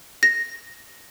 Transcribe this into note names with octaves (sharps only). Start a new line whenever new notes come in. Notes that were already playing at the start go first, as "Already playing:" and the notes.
A#6